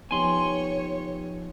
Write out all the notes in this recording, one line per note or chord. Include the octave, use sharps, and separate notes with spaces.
F3 B3 D#4 G4 C#5 G#5 C6